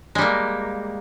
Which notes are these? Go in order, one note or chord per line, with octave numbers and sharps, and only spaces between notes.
G3 G#3 A#3